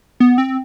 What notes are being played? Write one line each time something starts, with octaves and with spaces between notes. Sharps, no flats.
B3
C4